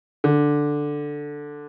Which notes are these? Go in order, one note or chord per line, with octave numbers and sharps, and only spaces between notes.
D3